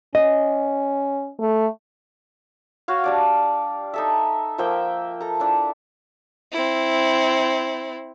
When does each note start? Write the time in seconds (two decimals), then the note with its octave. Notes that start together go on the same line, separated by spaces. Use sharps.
0.15 C#4 D#5
1.40 A3
2.88 F#4 C#5 F5
3.04 G3 D4 D5
3.94 D#4 A4 E5
4.58 F3 A#3 E5 G5
5.20 A4 A#5
5.40 D4 E4
6.52 C4 E4